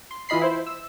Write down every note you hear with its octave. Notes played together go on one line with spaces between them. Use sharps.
C6
E3 F4 D#5 B5 C7
E4 C5
E6